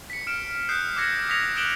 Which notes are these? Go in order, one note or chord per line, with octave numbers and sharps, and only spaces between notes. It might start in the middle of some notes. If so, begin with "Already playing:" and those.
B6 C#7
F6 C#7 D7 E7
D#6 F#6 G6 C7 C#7
D6 E6 F#6 G#6 A#6 C#7
D#6 G#6 A#6 B6 C#7 F7
D#6 F#6 D7 E7 F#7 G7